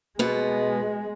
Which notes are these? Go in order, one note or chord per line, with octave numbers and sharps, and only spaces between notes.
B2 G#3 B3